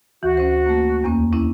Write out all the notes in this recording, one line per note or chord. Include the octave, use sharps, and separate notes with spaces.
D2 E3 F#4
C#4 C5
A3 A#3
E2 A#3 C#4
C#4 D4 E4